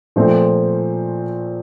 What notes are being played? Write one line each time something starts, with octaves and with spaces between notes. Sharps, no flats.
A#2 F3 A3 C4